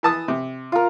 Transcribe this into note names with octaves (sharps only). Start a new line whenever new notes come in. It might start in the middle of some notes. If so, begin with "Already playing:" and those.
E3 A5 D#6
C3
F4 A#4